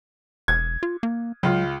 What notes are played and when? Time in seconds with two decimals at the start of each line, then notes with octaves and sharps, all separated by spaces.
0.48 E1 G#6
0.83 F4
1.03 A#3
1.43 C#2 F#3 F4